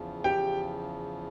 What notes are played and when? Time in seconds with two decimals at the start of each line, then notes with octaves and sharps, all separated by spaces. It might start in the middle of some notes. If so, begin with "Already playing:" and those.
Already playing: E2 C#3 F3
0.24 G4 G5